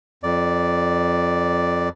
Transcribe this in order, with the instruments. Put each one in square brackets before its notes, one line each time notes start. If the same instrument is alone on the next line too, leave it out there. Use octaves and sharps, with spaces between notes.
[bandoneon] F2 D5